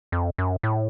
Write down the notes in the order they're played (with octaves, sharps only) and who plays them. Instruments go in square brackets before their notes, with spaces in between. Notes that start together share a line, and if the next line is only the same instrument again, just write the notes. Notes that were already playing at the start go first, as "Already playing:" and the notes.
[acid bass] F2
F#2
A2